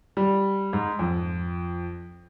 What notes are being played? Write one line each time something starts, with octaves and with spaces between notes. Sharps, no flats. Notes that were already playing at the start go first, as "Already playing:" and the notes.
G3
G#2
F2